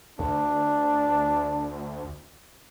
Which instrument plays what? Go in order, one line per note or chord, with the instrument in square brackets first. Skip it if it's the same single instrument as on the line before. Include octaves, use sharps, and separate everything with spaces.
[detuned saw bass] D2 [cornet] D4